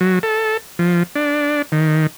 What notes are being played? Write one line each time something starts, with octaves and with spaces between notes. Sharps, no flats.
F#3
A4
F3
D4
D#3